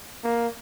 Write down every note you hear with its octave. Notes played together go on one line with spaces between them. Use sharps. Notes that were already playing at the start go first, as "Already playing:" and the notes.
A#3